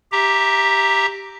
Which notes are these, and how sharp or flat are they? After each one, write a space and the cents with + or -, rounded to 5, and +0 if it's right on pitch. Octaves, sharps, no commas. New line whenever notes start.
G4 +0 E5 +0 A#5 +0